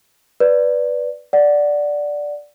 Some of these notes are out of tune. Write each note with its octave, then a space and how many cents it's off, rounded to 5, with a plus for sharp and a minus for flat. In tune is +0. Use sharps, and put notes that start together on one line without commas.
B4 +0 D5 +0
D5 +0 F#5 +0